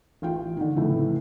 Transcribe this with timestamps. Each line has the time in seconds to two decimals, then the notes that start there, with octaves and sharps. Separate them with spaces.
0.22 A1 F4 G5
0.57 D3 D#3
0.76 F2 A2 C#3 E3 A3